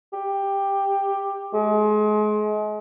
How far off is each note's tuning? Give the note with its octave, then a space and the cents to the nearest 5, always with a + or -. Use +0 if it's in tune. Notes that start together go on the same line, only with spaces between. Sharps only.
G4 +10
G#3 +35